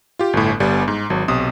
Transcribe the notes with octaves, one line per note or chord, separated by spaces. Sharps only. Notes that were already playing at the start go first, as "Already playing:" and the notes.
F4 G4
G1 A2
G1 G3 B3
G#2
G#1 F#3
B1 C3 D#6